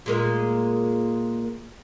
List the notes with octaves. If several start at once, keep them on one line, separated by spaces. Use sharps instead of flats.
A#2 G#3 A#3